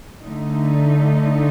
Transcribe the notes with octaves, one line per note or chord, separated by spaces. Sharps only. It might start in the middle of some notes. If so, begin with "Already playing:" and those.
D3 A3 D#4